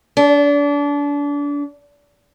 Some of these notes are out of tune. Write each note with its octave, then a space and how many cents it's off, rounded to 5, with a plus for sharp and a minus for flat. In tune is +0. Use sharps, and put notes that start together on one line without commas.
D4 -30